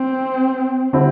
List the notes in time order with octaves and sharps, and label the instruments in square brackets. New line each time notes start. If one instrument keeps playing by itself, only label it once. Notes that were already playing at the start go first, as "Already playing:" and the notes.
Already playing: [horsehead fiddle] C4
[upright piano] D3 G3 C4 E4